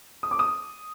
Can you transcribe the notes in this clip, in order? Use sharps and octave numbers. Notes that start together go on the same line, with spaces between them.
D#6
D6
D#6